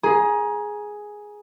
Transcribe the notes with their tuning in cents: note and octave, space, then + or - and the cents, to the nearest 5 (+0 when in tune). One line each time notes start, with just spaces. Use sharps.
G#4 +5 A#5 +25